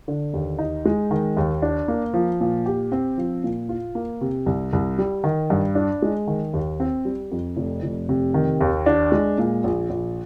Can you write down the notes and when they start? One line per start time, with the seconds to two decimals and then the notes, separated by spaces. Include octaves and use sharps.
0.08 D3
0.34 D#2
0.59 D#4
0.85 G#3
1.11 D#3
1.37 D#2
1.62 D4
1.88 A#3
2.14 F3
2.41 A#2
2.66 G4
2.92 C4
3.18 F3
3.44 A#2
3.69 F4
3.95 A#3
4.21 C3
4.46 C2
4.73 C2
4.98 G3
5.24 D#3
5.50 G2
5.75 D4
6.02 G#3
6.27 D#3
6.54 D#2
6.80 C4
7.05 G3
7.31 F2
7.57 F1
7.83 F1
8.09 C3
8.34 D#3
8.61 D#2
8.86 D4
9.12 G#3
9.38 A#2
9.64 A#1
9.90 A#1